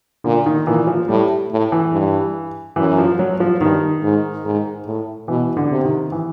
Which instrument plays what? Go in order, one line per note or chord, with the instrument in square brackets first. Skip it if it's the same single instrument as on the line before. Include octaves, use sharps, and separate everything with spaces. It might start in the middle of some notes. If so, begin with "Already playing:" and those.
[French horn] A#2 [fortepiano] D3
[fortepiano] D#3
[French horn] A#2 [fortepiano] E3
[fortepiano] F3
[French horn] A2 [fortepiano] G3
[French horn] A2
[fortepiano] E3
[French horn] G2
[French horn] F#2 [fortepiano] E3
[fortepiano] F3
F#3
F3
[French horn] G2 [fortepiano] D#3
[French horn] G#2
G#2
A2
[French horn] B2 [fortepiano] E3
[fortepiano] D3
[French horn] C3
[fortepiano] D#3
E3